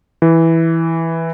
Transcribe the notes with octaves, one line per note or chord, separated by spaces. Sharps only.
E3